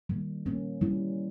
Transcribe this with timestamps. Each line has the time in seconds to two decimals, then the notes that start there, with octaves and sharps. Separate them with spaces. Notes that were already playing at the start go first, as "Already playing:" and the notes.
0.09 D#3 G3 A#3
0.46 G3 A#3 C#4
0.81 G3 C#4 E4